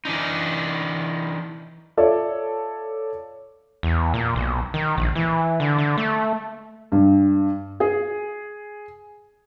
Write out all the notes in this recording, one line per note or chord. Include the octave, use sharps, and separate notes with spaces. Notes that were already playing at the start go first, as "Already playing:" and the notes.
E3 D4 D#4
F4 A4 C#5 D5 E5
E2
A#2
B1
D#3
A#1
E3
D3
D3
A3
G2
G#4